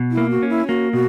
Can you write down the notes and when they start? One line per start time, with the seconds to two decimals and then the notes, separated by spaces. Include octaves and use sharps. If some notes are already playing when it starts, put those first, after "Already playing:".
Already playing: B2
0.12 E4
0.17 A#3
0.30 F#4
0.43 C#4
0.49 E4
0.68 A#3 F#4
0.93 B2 F#4